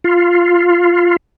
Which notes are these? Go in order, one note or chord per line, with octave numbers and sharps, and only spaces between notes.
F4